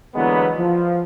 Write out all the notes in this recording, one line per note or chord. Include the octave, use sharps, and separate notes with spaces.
D3 E3 F#3 G#3 A#3 B3
F3